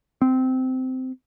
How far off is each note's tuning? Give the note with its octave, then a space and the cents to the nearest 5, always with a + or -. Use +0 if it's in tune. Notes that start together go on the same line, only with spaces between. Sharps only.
C4 -15